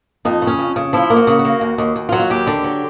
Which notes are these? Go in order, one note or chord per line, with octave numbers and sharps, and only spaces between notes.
F2 D#4
C#3
C#4
F2
C#3
F3 E4
A#3
F#4
C#3
F#4
A#3
D#2
D#2
D#2
F#3 F4
F#4
D#2 G4
D3
F#3